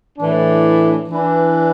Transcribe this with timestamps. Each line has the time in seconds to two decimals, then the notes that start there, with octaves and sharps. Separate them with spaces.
0.19 A2 E3 D4
1.09 E3 D4 B4